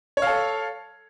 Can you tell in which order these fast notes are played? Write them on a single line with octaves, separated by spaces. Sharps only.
C#5 F5 A4